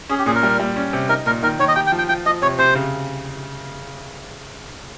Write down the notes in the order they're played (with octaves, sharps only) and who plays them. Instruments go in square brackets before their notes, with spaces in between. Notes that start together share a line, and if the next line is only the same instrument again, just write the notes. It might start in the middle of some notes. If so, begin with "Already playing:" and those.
[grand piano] C#4 [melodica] G#4
[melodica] G4
[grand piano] A#2 [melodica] G#4
[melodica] A#4
[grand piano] G3
G3
C#4
C3
[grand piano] D#4 [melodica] A#4
[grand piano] A#2 [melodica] A#4
[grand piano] D#3 [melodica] A#4
[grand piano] D#3 [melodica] C#5
[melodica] D#5
[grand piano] G4 [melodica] G5
[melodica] G5
[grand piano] F3
[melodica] G5
[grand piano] F3 [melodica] G5
[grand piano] F3 [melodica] D#5
[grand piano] C3 [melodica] C#5
[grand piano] C3 [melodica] C5
[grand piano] C#3